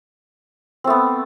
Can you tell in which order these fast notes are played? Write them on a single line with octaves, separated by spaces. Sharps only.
C4 A3 B3